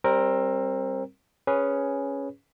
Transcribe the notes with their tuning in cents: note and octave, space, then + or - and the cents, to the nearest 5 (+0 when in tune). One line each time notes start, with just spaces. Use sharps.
G3 +0 C4 +25 A#4 +0
C#4 +0 G#4 +0 B4 -5